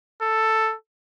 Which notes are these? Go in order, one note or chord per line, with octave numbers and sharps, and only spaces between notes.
A4